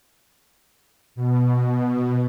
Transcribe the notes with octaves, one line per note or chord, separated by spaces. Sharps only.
B2